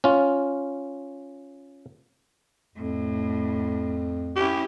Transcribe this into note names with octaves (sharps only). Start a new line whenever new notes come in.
C#4 F4
F2 A2
C#4 E4 G4